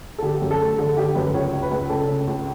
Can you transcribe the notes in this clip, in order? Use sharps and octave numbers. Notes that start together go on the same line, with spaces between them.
A4
D3 G4
F#2
A4
A3
D3 A4
D3 G4
F#2 B4
C#2 C#5
C#2
B4
C#2
C#3 A4
C#3
C#2